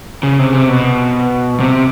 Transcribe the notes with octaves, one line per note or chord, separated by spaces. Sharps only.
C#3
C3
C3
B2
C3